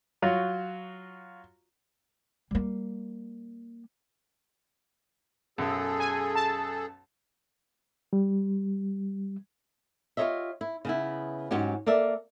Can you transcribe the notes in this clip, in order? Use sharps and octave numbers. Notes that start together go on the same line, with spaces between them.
F#3 F4 F#4
G3 A#3
B1 F#2 G#4 A4
G#5
A5
G3
F4 G4 A4 C#5 D#5 E5
E4
C#3 B3 E4
G#2 F#3 C#4 F#4 G4
A#3 A4 D5 E5